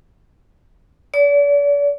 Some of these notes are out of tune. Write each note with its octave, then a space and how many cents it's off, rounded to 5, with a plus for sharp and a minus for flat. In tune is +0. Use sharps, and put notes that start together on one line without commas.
D5 -40